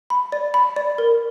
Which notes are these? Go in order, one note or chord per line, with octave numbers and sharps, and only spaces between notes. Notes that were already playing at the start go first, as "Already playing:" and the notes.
B5
D5
B5
D5
A#4